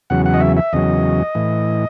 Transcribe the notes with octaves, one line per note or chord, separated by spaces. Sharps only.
E2 C#3 F#3 F#5
F#5
D#5
E5
E5
E2 C#3 F#3 D#5
A2 E3